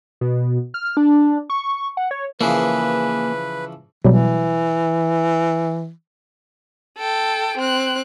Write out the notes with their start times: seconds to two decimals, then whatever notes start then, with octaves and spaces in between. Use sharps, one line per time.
0.21 B2
0.74 F6
0.97 D4
1.50 C#6
1.63 C#6
1.97 F#5
2.11 C#5
2.41 C#3 E3 F3 A#3 G#4 B4
4.04 B2 E3 F#3 G3
6.98 A4 G5
7.58 C4 F#6